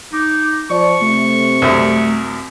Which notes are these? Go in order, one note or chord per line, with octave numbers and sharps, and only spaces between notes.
D#4 D6
F3 D5 C#6
C3 A3
C2 F#2